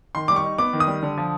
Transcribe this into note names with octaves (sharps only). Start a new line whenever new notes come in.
D#3 C6
G3 D6
C#6
D#4
B3 D6
D#3
D#6
G3
D3
F3